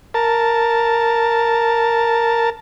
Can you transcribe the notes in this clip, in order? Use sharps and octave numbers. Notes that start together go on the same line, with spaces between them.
A#4 A5